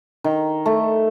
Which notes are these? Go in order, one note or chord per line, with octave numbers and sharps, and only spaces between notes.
D#3
A3